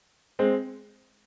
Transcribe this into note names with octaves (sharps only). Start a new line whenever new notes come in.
G#3 C4